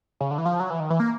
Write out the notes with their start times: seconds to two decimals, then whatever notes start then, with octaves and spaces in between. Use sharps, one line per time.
0.21 C#3
0.31 D3
0.38 E3
0.45 F3
0.60 F#3
0.70 E3
0.80 D#3
0.90 E3
1.00 A#3